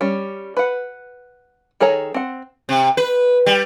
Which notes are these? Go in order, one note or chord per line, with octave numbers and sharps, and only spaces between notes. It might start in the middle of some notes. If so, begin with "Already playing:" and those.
G3 C#4
B4 F#5
D#3 G#4 A4 C#5 A#5
C4 F#5
C3
B4
G3